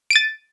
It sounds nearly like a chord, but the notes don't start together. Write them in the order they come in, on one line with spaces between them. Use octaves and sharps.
D7 D#7 A6